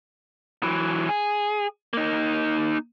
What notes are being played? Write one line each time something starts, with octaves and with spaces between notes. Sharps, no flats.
E3 F#3
G#4
A#3 D#4